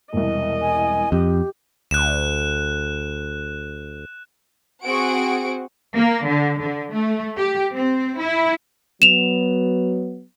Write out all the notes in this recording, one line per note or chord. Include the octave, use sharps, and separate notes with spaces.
E1 C2 D#5
G#5
F2 G4
D2 F#6 E7
C4 F#4 G#4 F#5 C#6 D7
A#3
D3
D3
A3
G4
C4
E4
F#3 B3 E7 F7